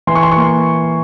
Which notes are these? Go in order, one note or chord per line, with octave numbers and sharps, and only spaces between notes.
E3 C6
C#6
C6
C#6
A#3 C6